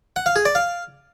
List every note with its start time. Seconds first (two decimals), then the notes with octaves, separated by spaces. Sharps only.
0.16 F#5
0.26 F5
0.36 G#4
0.45 D5
0.55 F5